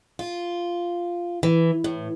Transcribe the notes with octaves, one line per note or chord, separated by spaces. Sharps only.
F4
E3
A2